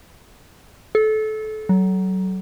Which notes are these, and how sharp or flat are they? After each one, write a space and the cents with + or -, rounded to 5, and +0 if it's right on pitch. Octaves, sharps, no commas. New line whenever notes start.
A4 -25
F#3 +25